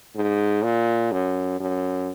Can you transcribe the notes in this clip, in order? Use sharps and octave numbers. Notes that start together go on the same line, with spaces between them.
G#2
A#2
F#2
F#2